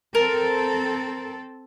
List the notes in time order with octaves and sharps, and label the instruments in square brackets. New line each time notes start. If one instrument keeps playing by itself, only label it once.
[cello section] C4 A4 [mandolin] A#4